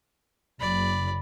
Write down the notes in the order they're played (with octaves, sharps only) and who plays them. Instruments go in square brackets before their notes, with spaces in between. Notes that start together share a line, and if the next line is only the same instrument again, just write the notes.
[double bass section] F#1 [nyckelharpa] D5 B5